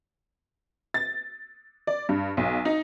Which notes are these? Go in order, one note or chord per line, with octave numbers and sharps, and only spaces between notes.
A6
D5
G2
B1
D#4